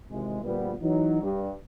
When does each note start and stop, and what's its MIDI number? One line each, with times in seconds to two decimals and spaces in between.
0.10 0.40 32
0.10 0.40 48
0.10 0.40 52
0.10 0.40 56
0.43 0.74 38
0.43 0.74 46
0.43 0.74 53
0.43 0.74 55
0.43 0.74 59
0.81 1.19 52
0.81 1.19 54
0.81 1.19 63
1.22 1.51 43